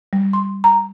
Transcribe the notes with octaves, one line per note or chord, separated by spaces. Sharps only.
G3
C6
A#5